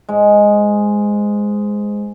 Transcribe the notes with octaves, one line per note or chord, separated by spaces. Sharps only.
G#2 G#3